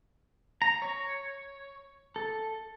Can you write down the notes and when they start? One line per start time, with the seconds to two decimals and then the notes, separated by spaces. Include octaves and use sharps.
0.62 A#5
0.82 C#5
2.16 A4